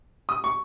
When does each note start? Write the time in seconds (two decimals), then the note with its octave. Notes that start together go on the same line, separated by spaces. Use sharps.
0.29 D#6
0.44 C#6